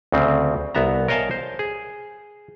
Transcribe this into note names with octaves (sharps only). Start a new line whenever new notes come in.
D2 C#3 C4
C2 B3 E5 A#5
A#4 C#5 D#5 F5 G#5 A5
C5
G#4